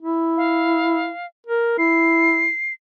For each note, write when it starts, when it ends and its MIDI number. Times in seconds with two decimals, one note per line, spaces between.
0.02 1.10 64
0.37 1.26 77
1.47 1.75 70
1.78 2.50 64
1.78 2.73 96